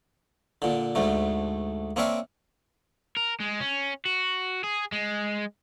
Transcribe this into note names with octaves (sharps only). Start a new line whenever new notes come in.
A#2 D3
D2 G#2 D3 A3
A#3 C4 D4 C#5 E5 F5
A#4
G#3
C#4
F#4
G#4
G#3